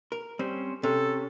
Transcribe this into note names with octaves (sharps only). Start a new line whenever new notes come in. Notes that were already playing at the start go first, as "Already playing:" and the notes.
A#4
G3 C4 C#4 C5
C3 C#4 A4